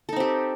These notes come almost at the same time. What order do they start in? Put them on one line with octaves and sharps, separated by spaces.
A4 D#4 C4 G4